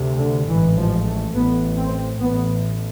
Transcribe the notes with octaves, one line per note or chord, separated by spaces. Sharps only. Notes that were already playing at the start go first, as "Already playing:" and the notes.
Already playing: D2 C3
D3
A1 G#2 E3
F3
A3
A1 A2 B3
C4
A1 A2 B3